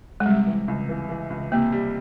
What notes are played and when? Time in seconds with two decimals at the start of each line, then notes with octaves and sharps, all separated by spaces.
0.20 G#3
0.26 C3 G3
0.47 E3
0.68 C#2
0.89 E3
1.09 E3
1.30 C#2
1.52 C3 A#3
1.72 G3